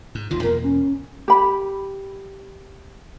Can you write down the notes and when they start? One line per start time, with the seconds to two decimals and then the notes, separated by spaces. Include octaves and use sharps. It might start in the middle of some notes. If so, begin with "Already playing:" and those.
0.15 G#2
0.31 G1 D#2 D#3 F4
0.43 E2 B2 A#3 A#4
0.63 C#4
1.28 G4 B5